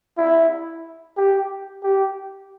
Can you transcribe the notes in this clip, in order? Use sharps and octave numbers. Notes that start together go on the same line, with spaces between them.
E4
G4
G4